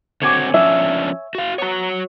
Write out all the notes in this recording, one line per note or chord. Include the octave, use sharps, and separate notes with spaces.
D3 C4 F#4 C#5 G#5 D6
F3 C#4 D4 E5
F#4 F5
B3 F#4 C#5 A#5